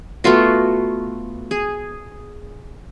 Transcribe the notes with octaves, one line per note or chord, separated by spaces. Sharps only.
A3 B3 F4 F#4
G#4